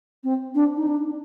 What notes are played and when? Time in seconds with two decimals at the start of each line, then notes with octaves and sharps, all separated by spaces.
0.24 C4
0.55 D4
0.77 D#4
0.87 D4